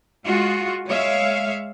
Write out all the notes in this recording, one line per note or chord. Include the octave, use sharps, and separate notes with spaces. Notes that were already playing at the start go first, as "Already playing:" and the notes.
G#3 F4 F#4
G#3 C#5 E5 F5